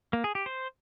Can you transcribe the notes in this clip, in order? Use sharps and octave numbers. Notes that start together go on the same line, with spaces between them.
A#3
G#4
G4
C5